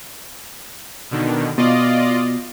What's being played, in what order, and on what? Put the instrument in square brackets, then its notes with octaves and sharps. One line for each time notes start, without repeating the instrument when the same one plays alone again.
[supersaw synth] B2 D3 D#3
[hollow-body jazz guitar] B2 [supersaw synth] F4 D5 D#5